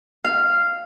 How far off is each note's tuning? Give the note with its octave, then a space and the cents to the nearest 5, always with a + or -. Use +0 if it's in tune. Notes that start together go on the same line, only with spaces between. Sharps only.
F5 -10